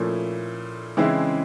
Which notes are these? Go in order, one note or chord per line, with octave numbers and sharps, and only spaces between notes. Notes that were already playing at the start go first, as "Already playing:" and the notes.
Already playing: A#2 F3 A3 C#4 E4
C#3 E3 G#3 C4 E4